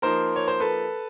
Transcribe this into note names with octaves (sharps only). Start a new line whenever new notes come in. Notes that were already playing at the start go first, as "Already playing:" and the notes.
F3 A#3 D#4 A#4 C5
C#5
C5
A4 B4